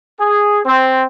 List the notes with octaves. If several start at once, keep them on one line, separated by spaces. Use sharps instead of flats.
G#4
C4